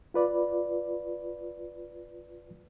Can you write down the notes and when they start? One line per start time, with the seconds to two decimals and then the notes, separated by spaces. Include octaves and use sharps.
0.14 F4 B4 D5